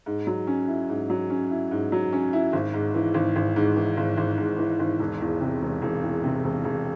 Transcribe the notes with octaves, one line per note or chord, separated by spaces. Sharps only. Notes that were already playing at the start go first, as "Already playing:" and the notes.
G#2
F#3
C#4
E4
G#2
F#3
C#4
E4
G#2
F#3
C#4
E4
G#1
G#2
E3
G#1
G#1
G#2
E3
G#1
G#1
G#2
E3
G#1
E1
E2
C3
E1
E1
E2
C3
E1
E1